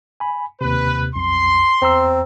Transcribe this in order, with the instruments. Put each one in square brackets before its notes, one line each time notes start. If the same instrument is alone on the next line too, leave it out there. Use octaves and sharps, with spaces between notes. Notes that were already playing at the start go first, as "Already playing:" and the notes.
[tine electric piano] G#5 B5
[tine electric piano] D#2 C3 [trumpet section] B4
[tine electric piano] B1 F2 [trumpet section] C6
[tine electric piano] E2 A#5 E6 [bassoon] C4